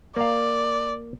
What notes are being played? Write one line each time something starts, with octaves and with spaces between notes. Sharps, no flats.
A#3 D5 F5